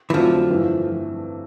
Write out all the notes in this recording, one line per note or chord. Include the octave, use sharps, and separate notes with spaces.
E3
F2 D3 F3 F#3 A3 D4
G2 E3 A3